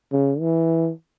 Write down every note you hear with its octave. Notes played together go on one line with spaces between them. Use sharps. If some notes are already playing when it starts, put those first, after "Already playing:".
C#3
E3